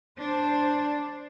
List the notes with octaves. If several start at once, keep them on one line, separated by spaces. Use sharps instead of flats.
D4 C5